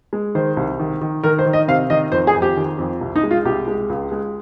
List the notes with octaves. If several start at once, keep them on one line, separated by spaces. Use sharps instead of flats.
G#3
D#3 C5
C2
D#3
D#3
D#3 A#4
C5
D#3
D#5
C3 F5
D#3 D#5
F2 C5
G#4
F2
G4
D#3
F2
C2
D#4
G#3
F4
C2 G4
G#3
C#2
G#3